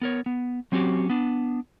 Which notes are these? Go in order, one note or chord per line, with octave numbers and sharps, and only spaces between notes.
B3 A#4 C#5
B3
F#3 C4 C#4 F#4 G4
B3 D4